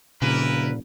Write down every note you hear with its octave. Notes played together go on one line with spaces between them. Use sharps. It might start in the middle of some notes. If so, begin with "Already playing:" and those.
F1 A#2 C#3 E4 A#4 B4